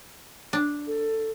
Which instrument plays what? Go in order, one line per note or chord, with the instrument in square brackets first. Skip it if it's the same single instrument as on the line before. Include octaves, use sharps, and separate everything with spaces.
[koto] D4
[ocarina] A4